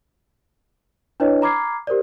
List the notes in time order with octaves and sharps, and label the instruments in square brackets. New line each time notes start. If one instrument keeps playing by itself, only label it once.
[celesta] D4 E4 B4 C#5 D#5
A#5 B5 D6 F6 G#6 C7
G4 A#4 C5 D5